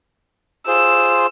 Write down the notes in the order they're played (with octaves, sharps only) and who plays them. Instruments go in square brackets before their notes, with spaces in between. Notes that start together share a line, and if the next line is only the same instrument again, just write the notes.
[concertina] F4 G#4 C5 [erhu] E6